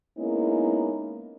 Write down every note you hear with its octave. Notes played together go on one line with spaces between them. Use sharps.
G#3 A#3 B3 C#4 D#4 E4